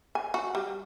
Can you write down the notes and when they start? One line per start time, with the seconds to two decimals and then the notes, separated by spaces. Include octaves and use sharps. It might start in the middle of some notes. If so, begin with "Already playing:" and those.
0.15 G#5
0.34 F#4
0.55 G3